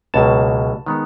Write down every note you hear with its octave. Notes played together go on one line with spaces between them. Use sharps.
C#2 B2 F#3 A#3 A5
D#3 G#3 B3